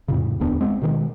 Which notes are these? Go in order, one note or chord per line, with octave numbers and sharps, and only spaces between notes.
F2 A2 C#3
E1 D2 B3 D4
D#1 G#3 C4
B2 D#3 G#3